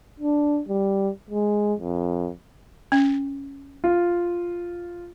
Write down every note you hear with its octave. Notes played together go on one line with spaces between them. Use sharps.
D4
G3
G#3
F2
C#4
F4